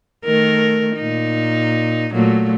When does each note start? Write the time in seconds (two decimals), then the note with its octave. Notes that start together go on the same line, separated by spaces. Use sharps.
0.25 D#3 A3 A#4
0.96 A#2 D#4
2.13 A#2 F#3 A3